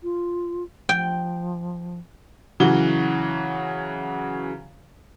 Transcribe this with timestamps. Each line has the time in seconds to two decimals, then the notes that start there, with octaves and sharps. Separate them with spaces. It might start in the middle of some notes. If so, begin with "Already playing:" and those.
0.03 F4
0.89 F3 G5
2.60 C#3 E3 F#3 F#4 G7